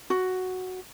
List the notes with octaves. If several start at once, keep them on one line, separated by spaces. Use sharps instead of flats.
F#4